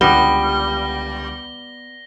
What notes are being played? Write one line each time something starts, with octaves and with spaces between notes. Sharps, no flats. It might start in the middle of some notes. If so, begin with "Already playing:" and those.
C#2 D3 G3 B3 G4 A#6 G7